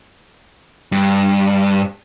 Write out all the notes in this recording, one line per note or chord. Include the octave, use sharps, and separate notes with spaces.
G2